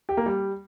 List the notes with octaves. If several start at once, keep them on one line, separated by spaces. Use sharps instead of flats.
G4
A#3
G3